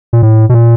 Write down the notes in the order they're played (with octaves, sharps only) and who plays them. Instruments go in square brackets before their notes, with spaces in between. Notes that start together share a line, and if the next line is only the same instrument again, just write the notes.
[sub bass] A#2
A2
B2
A#2